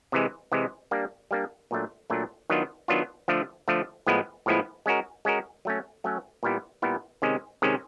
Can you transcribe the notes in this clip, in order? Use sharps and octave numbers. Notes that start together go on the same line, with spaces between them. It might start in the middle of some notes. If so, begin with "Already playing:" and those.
C3 E3 G#3
C3 E3 G#3
G3 A#3 D4
G3 A#3 D4
A#2 F#3 A3 D4
A#2 F#3 A3 D4
D#3 F#3 B3 D4 F4
D#3 F#3 B3 D4 F4
D3 F3 A3
D3 F3 A3
A2 F3 G#3 B3 E4
A2 F3 G#3 B3 E4
G#3 C#4 F#4 A#4
G#3 C#4 F#4 A#4
F#3 A3 C#4
F#3 A3 C#4
A#2 G3 B3 E4
A#2 G3 B3 E4
C3 D#3 G#3 C#4
C3 D#3 G#3 C#4